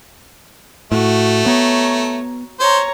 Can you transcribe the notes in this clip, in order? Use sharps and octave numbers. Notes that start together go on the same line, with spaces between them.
A2 A3 F#4
B3 C#5 A#5
C5 C#5 A#5